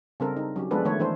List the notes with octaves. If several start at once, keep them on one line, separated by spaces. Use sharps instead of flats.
C#3 G3 C4 D4 A4 A#4
D#4
F#3 C#4 G4
F3 G#3 B3 D4 A4 B4
D#3 A3 A#3 C#5
E3 D4 E4 A4 C5